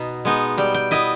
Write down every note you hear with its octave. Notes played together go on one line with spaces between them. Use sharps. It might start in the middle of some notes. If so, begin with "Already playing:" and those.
Already playing: B2 B3 D#4
G#3 B3 D#4
G3 G5
G5
B3 E4 D#5